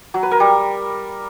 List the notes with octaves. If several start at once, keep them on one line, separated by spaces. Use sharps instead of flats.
F#3
B4
A#4
G3